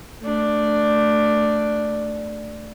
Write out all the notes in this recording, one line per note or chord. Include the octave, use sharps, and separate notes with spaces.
A3 D4